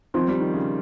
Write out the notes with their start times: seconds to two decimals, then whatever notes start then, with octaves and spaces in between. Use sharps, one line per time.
0.14 D#3 F3 C4 F4
0.28 G3
0.40 D#3
0.54 C#3